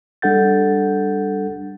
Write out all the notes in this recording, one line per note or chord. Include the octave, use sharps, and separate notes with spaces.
G3 D4 A4 F#5 G6 A6